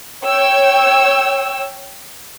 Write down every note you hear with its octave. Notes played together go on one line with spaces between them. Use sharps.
C#5 G5 E6